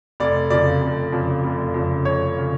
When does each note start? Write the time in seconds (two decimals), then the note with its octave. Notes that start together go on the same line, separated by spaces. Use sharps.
0.20 F1 D5
0.50 F2 C#3 D5
0.81 F1
1.12 F2 C#3
1.43 F1
1.74 F2 C#3
2.05 F1 C#5
2.38 C#3